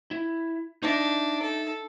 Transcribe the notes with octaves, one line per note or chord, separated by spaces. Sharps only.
E4
D4 D#4 D#5 E5
A4